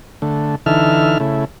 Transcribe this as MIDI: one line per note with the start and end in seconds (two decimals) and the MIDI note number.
0.22 0.55 50
0.22 0.55 57
0.66 1.18 50
0.66 1.18 52
0.66 1.18 63
0.66 1.18 69
0.66 1.18 76
0.66 1.18 89
1.20 1.45 49
1.20 1.45 57
1.20 1.45 64